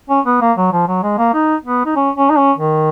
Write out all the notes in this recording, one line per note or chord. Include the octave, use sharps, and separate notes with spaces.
C#4
B3
A#3
F#3
F3
F#3
G#3
A#3
D#4
B3
D#4
C#4
C#4
D#4
C#4
D#3